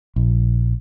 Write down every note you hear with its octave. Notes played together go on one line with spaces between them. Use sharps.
A#1